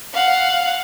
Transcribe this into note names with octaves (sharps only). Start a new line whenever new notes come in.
F5 F#5